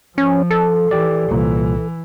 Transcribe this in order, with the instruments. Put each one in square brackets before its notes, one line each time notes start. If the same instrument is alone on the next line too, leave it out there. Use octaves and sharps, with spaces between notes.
[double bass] F3 [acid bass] C#4
[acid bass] A4
[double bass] E3 [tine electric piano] G4 D5
[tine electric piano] C2 A#2 [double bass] E3